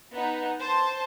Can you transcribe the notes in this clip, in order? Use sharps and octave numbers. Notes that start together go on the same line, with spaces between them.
B3 D#4
C5 A5